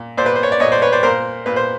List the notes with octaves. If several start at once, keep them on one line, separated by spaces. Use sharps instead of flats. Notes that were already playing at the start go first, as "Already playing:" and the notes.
Already playing: A#2
A#2 C5 D5
B4
C5
C#5
D5
A#2 C#5 D#5
C5 D5
B4 C#5
C5 D5
A#2 A#4 C5
A#2 B4
C5